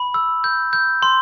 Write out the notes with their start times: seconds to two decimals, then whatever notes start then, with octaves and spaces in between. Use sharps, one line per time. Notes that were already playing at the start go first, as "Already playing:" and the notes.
Already playing: B5
0.14 E6
0.44 G6
0.73 G6
1.02 C6